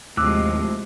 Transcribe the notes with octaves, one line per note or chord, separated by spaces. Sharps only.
D#2 A2 C3 F3 G#3 D6 E6 F#6